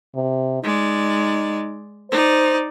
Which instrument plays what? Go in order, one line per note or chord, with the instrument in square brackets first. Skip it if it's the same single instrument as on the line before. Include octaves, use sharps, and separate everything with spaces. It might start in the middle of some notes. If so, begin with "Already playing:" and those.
[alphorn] C3
[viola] G#3 D5 [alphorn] D#4
[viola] D#4 D5 [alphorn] C5